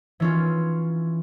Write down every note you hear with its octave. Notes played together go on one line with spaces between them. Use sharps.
E3 C#4 F4